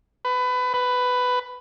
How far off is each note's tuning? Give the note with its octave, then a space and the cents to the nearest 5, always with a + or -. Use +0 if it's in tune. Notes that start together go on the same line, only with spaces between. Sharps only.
B4 +20
B4 +10